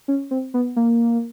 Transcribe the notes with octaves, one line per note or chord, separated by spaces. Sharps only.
C#4
C4
B3
A#3